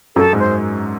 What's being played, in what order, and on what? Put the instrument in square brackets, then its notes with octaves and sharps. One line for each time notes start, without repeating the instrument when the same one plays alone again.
[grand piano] F#2 F#3 [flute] A4
[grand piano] G#2 G#3
[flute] C5